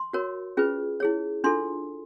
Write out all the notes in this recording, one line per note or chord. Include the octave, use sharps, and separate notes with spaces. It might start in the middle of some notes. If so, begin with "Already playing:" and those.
Already playing: C6
F#4 A#4 C#5
C#4 F4 G#4 B4
E4 G#4 C#5
D4 F4 A4 C6